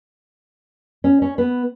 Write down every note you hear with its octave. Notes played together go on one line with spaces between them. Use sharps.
C#4
C#4
B3